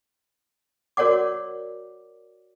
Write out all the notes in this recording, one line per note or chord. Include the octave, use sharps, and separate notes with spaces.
F#4 A#4 C#5 D5 F#5 D6